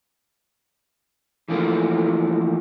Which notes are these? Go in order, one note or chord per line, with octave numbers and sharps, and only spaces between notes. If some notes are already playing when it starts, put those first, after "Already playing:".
E3 F3 A3 A#3 D4 E4